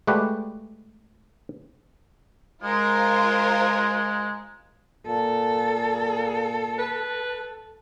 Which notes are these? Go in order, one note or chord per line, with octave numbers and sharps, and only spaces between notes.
G#3 A3 F#4 G4 B4 D5
G#3 F4 A#4 C5
A#2 A4
B4